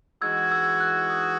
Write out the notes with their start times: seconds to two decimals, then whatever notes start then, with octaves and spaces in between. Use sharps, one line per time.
0.22 E3 G#3 D#4 F#4 E6 G#6
0.51 E6 G#6
0.80 F#6
1.09 D#6